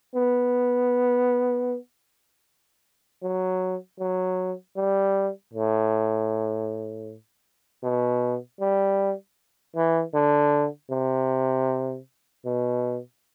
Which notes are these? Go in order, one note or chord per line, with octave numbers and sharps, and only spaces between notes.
B3
F#3
F#3
G3
A2
B2
G3
E3
D3
C3
B2